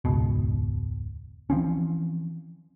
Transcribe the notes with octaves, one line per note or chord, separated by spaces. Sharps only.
E1 C#2 G#2 B2
E3 F3 C4 C#4